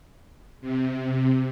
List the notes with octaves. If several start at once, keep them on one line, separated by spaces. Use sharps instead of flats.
C3